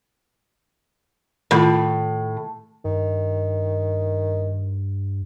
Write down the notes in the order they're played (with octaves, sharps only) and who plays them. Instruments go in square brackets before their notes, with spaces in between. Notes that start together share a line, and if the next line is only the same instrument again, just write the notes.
[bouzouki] A2 [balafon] D#3 A3 F4
[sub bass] G2 [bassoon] D#3